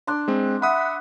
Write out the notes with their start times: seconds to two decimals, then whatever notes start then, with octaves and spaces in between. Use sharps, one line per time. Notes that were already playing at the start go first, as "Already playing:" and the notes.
0.07 D4 C6
0.28 G#3 C4
0.62 E5 F#5 B5 D#6